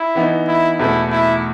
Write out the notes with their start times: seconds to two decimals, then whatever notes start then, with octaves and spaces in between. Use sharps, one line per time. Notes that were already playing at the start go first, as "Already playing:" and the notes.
Already playing: E4
0.15 E3 B3 D#4
0.48 E4
0.79 E2 B2 A3 E4
1.12 E4